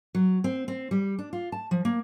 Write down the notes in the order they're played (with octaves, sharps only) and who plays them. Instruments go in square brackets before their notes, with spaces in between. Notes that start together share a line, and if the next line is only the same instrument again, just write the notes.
[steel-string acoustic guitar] F#3
C4
C4
G3
D4
F4
A5
F3
A#3